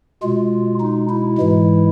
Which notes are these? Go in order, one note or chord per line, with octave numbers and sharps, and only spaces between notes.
B2 G#3 F4
D#4
E4
G#2 E3 G#3